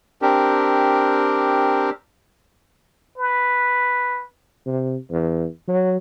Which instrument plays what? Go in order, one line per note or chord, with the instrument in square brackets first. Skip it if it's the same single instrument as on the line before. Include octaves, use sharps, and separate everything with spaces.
[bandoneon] C4 D4 G4 A#4
[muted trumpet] B4
[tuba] C3
E2
F#3